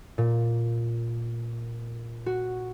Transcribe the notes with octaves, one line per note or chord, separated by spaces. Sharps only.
A#2
F#4